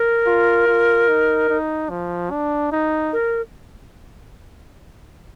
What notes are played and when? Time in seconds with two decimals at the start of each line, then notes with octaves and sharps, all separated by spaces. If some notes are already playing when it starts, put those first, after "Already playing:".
Already playing: A#4
0.26 F4
0.67 F4
1.08 D#4
1.49 D#4
1.90 F3
2.31 D4
2.72 D#4
3.13 A#4